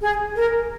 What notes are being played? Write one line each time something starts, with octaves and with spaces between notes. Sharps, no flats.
G#4
A#4